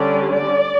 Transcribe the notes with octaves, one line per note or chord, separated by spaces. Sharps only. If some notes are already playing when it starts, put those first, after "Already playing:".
Already playing: D3 G3 C#4 D5
D5